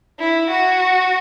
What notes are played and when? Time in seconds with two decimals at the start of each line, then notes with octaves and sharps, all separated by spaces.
0.19 E4
0.50 F#4